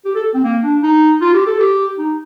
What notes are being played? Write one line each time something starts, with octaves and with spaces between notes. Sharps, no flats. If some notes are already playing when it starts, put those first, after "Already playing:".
G4
A4
C4
A#3
D4
D#4
F4
G4
A4
G4
D#4